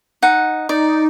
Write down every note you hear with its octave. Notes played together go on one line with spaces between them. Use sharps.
D#4 F#5
D#4 D5